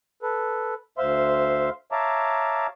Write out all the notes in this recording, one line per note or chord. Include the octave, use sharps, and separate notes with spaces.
A4 B4
D2 C5 E5 F5 C6
C#5 E5 F5 A5 A#5 D6